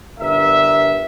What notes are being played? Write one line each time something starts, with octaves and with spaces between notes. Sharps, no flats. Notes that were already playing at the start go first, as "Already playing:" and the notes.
G1 G2 A#4 E5